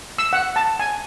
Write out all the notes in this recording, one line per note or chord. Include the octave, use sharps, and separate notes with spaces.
E6
F#5
A5
G#5